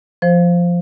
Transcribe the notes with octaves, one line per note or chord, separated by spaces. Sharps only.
F3 C5